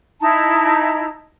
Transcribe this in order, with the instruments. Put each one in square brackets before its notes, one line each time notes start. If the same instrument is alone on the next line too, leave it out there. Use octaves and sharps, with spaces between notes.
[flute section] D#4 E4 A5 A#5